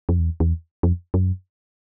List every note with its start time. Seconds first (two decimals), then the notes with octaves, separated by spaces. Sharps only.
0.09 F2
0.19 E2
0.40 E2
0.83 F2
1.14 F#2